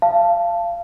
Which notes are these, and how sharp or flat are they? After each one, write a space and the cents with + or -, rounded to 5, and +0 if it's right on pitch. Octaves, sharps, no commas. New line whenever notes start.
F5 -25 A5 +0